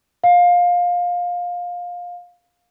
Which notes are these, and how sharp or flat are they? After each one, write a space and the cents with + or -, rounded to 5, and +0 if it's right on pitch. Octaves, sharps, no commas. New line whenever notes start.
F5 +20